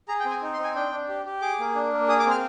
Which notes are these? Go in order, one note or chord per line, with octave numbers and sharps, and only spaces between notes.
G#4 A#5
G5
C4
G#5
D#4
C6
C4
G#5
D4 G5
D4
G4
G4
G#4 D6
A#3
D4
A#3
G#4 D#6
D6
C4
F6